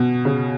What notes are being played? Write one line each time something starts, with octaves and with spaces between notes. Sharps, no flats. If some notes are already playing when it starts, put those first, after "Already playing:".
Already playing: B2
C#3